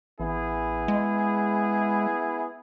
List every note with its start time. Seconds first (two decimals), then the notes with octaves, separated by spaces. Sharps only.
0.20 A1 B3 E4 G#4
0.88 G#3